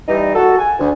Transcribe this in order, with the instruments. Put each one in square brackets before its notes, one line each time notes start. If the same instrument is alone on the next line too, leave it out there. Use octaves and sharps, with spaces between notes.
[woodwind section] E3 G3 D#4
F#4 A4
G#5
D2